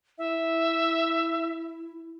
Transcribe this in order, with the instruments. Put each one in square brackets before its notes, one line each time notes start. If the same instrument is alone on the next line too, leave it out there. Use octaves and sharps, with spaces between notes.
[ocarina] E4 [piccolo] E5